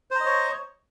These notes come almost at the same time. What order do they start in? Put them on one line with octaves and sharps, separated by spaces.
C5 A#5 D#5 C#5